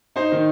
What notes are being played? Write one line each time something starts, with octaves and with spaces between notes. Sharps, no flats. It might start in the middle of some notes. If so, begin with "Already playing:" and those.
D#4 C5
D#3